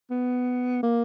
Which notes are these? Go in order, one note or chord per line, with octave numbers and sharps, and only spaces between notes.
B3
A#3